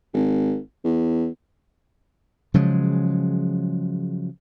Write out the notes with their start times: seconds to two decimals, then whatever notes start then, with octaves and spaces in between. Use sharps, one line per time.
0.14 G#1
0.84 E2
2.54 C#3 F3 F#3 G#3